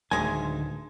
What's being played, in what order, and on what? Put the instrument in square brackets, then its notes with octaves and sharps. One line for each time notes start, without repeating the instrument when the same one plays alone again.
[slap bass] D1 D#3 [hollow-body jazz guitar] D2 G#3 G#5